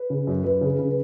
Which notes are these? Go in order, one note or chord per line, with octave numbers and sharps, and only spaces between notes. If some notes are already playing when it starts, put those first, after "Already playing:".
Already playing: B4
C#3
F#2
F#2 B4
C#3
C#3
B4